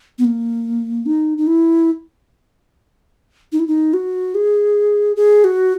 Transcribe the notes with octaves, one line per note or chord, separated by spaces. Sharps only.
B3
A#3
D#4
D#4
E4
D#4
E4
D#4
F#4
G#4
G#4
F#4